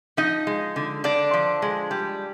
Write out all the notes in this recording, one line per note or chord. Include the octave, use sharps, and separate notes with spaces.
F3 D#4 D#5
G#3
D3
D3 D4 D5
F3
G#3
G3